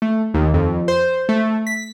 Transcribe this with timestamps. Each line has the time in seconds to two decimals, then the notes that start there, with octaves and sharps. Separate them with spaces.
0.02 A3
0.34 D#2
0.54 F2
0.88 C5
1.29 A3
1.67 B6